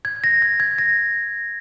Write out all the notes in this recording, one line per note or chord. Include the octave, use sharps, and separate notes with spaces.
G#6
A#6
G#6
G#6
A#6